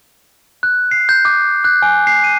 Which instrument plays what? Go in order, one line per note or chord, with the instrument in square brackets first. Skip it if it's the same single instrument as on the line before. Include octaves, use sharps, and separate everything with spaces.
[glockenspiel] F#6
C7
G6
D6
F#6
G#5
C7
D#7